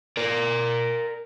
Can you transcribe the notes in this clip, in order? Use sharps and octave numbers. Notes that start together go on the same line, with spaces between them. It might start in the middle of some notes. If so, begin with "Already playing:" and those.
A#4 D5